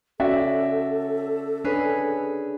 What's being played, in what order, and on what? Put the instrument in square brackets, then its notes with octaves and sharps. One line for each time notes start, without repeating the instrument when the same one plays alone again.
[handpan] C#4 [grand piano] F#4 D5 E5 [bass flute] A4
[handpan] D4 [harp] G#4 B4 C#5